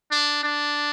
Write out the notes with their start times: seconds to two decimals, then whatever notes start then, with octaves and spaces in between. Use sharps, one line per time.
0.11 D4
0.43 D4